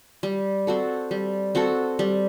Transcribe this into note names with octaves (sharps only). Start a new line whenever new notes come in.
G3
C4 F#4 A4
G3
C4 F#4 A4
G3